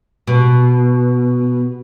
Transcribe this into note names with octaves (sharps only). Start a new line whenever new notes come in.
B2